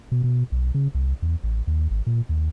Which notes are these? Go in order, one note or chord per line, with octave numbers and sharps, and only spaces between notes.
B2
B2
B1
C#3
C2
E2
A1
D#2
G#1
A#2
D#2